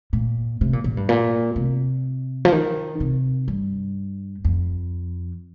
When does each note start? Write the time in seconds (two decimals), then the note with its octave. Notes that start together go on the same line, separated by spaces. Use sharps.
0.13 A#2
0.61 C3
0.73 A#2
0.84 A#2
0.97 G2
1.09 A#2
1.56 C3
2.45 F3
2.52 D#3
3.00 C3
3.48 G2
4.44 F2